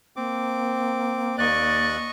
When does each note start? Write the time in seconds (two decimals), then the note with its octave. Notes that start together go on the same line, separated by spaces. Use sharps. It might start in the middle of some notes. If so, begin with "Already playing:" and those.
0.16 A#3 C4 D6
1.38 D#2 D5 D#5 C#6 F#6